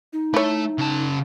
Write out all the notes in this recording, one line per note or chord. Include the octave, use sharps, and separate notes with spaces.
D#4
A3 E4 C#5
C#3 A5